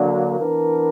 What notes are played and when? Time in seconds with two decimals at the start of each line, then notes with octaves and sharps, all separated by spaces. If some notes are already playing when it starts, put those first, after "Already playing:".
Already playing: D3 F#3 A#3 D4
0.38 E3 B3 D4 A#4